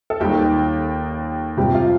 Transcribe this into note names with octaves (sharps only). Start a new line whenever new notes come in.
A4
D#2 D#3 G3 G4
F2 C3 G3 G4
F4